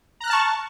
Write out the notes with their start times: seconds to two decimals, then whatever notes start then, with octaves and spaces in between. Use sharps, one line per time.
0.20 A#5
0.24 F#6
0.27 F6
0.30 A5
0.33 C#6